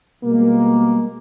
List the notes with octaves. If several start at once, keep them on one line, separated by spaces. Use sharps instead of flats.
B2 G3 G#3 A#3